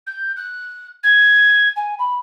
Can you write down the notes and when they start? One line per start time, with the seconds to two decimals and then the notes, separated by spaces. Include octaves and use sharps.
0.06 G6
0.36 F#6
1.03 G#6
1.76 G#5
1.98 B5